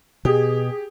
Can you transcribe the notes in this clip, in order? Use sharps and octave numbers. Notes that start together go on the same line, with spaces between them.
B2 G4 G#4